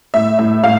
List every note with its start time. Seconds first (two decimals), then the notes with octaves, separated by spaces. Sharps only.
0.14 A2 E5
0.39 A2 E5
0.64 A2 F5